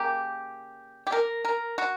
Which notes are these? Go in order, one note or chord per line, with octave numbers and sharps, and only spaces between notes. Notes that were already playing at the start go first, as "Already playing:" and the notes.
Already playing: C#3 A#3 G4
G4
A#4
A#4
F#4